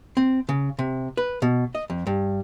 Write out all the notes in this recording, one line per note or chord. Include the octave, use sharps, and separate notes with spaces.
C4
C#3
C3
B4
B2
D#5
F2
G2